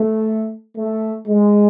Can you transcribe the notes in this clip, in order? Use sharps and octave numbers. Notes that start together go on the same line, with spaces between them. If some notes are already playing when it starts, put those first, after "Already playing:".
Already playing: A3
A3
G#3